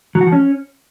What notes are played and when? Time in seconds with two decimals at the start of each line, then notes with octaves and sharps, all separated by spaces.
0.15 F#3
0.21 F#4
0.27 F3
0.32 C#4